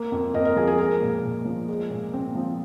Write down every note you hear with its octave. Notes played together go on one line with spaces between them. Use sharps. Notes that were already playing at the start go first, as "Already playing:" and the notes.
Already playing: A#3
F2
F2 A#4 D#5
A#4
F3 G#4
G#4
G#3 A#4
A#2
A#2
F3
G#3
A#2
C4
F3